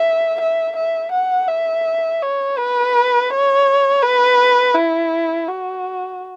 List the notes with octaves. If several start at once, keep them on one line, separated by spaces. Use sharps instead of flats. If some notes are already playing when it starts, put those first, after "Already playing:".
Already playing: E5
E5
E5
F#5
E5
C#5
B4
C#5
B4
E4
F#4